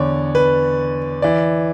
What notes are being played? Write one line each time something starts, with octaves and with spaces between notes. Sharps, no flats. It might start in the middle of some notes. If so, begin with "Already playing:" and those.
Already playing: E2 D3 C#5 D5
B4
E3 D5